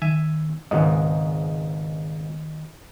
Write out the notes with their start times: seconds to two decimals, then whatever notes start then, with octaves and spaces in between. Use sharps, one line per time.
0.02 D#3 E5 G#5
0.71 G#1 C#2 G#2 D#3 D#5